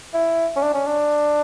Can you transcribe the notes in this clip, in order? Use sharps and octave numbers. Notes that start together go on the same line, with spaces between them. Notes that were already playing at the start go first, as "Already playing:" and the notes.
E4
C#4
D4
C#4
D4